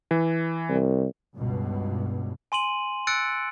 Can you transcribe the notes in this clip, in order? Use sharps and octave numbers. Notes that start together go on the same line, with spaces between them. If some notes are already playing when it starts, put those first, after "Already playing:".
E3
C2
C#2 G2 B2
G#5 C6 D#7 F#7
E6 F#6 A6 C#7 D7